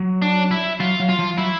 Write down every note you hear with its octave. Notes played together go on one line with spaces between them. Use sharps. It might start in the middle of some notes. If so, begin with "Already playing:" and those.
Already playing: F#3
D4
E4
F#3 F4
F#3
F4
F3
F#3 E4